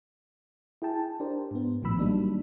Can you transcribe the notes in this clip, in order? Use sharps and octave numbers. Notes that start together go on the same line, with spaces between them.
E4 G#4 G5 A5
D4 G4 A#4 C5
G#2 B3
A#1 A2 D#3 F3 B5 E6
F#3 G3 A#3 D4 D#4